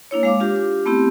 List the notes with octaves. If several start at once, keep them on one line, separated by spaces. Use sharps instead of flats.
A#3 D4 E4 C#5
G#3 F5 D6
D4 F4 G4
A3 B3 C4 E4 G4